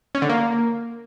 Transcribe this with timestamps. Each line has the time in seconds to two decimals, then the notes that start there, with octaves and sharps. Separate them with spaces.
0.15 C#4
0.22 D3
0.30 A#3